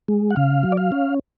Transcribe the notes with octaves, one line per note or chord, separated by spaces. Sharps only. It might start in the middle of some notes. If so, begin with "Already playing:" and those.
G#3
F#5
C#3 F5
F#3
D5
F5
C#4